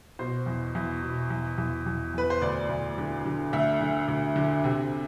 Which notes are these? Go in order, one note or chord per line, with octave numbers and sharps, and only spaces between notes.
B2 C5
E2
E2
B2
E2
E2
E2
E2 B4
C5
D2 D5
D2
D3
D3
D2 E5
D3
D2
D3
C3